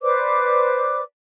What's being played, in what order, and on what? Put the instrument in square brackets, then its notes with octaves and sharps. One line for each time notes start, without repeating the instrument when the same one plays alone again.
[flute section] B4 C5 D5 D6